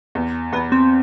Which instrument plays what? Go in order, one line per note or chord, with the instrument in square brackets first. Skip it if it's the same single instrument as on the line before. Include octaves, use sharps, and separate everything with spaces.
[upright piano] E2
[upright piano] E2 [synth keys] B3
[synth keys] C4